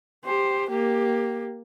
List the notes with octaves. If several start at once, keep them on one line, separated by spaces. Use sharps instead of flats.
G4 C5
A#3 G4